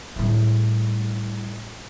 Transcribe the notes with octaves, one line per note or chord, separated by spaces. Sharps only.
A2 G3